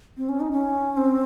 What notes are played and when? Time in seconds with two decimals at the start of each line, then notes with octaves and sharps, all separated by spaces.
0.17 C4
0.29 C#4
0.40 D#4
0.51 C#4
0.97 C4